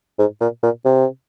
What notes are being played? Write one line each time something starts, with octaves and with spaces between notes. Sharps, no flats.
G#2
A#2
A#2
C3